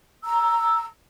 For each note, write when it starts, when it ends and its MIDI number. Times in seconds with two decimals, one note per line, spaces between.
0.25 0.85 82
0.25 0.85 88